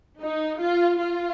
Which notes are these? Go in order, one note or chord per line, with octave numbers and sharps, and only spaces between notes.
D#4
F4
F4